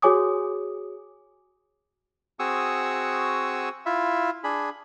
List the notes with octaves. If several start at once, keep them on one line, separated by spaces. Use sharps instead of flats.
F#4 G#4 C#5 G#5 D6 D#6
C4 F#4 G#4 C#6 D#6 E6
E4 F4 E5
D4 G#4 B5